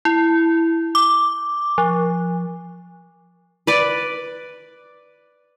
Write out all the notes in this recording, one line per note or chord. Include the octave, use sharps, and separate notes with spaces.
E4
D6
F3
B4 D5